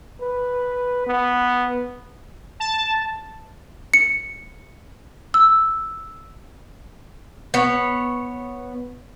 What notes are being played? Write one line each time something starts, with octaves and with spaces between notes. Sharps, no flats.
B4
B3
A5
C#7
E6
B3 C#5